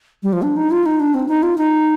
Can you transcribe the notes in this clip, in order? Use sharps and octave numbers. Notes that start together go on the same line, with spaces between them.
G3
F3
D4
D#4
F4
D#4
D4
C4
D#4
F4
D#4